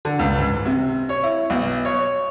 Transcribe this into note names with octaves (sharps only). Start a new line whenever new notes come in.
D3
C#2
G#2
C3
C#5
E4
B1
C#5